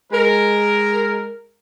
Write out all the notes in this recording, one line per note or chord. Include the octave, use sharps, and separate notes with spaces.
G#3 A#4